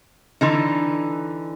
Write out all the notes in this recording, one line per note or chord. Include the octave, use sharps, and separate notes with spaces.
D3 E3 D#4